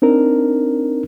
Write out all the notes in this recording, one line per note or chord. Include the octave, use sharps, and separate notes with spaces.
C4 D4 D#4 A#4